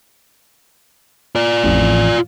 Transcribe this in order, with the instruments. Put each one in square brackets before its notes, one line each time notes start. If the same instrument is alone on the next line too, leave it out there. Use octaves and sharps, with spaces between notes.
[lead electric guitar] F4 D5
[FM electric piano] A1 F2